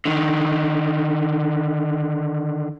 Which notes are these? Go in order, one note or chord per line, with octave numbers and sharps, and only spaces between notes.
D3 D#3